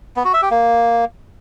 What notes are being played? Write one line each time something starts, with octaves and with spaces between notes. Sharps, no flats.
B3
F#4
E5
G4
A#3